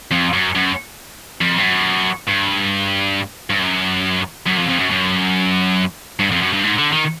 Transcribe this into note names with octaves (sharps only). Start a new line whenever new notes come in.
F2
F#2
F#2
F2
G2
F#2
G2
G2
F#2
F#2
F2
F2
F#2
F#2
G2
F2
F#2
G2
G#2
D3
D#3